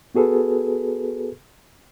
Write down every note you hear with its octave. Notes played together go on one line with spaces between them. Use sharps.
B3 F#4 G#4 A4 B4